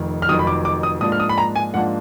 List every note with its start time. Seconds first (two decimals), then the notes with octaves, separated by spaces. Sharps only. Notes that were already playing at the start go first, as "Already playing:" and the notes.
Already playing: F1 F2 D#3
0.22 F6
0.28 F1 F2 D#3 F#3 D#6
0.39 B5
0.47 D6
0.65 D6
0.83 D#6
1.01 G#2 F3 A#3 D4 D#6
1.12 F6
1.20 D#6
1.29 B5
1.38 A#5
1.56 G#5
1.74 G#2 F3 A#3 D4 F#5